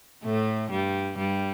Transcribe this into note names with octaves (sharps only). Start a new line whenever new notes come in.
A2 A3
G2 G3
G2 G3